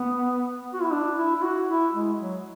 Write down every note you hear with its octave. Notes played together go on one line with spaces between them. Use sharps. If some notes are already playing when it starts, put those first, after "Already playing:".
Already playing: B3
F#4
E4
D4
E4
E4
F#4
E4
G#3
F#3